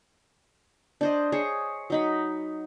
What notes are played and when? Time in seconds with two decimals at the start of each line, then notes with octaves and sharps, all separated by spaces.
1.01 D4 C5 D#5
1.32 G#4 C5 C#5
1.90 F#3 D#4 B5